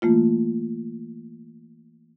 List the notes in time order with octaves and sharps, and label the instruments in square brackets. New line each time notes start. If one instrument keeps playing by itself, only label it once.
[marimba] E3 A3 A#3 F4